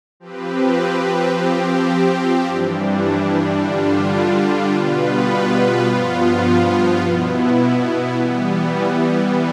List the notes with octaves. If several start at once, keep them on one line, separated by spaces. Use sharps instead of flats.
F3 C4 G4 B4
F3 C4 G4
G2 E3 G3 D4
D3 G3 D4 F4
B2 G3 B3 F4 B4
G2 F3 B3 F4
B2 B3 E4
E3 G3 B3